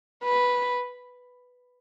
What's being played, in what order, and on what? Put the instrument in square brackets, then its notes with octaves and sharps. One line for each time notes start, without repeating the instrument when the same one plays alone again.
[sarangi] B4